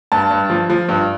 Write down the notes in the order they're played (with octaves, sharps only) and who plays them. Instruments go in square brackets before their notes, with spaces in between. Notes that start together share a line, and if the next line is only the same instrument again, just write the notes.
[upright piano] G2 A5
G2
F3
F3
G2